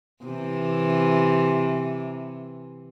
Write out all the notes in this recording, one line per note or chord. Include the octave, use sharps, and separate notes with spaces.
C3 E3